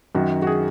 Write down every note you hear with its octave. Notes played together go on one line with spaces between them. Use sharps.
F#2 D#3 F#4
F#4
G#4